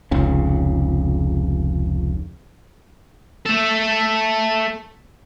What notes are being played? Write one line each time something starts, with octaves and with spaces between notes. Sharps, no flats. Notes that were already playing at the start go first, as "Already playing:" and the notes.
F1 C#2 C#3
A3 A4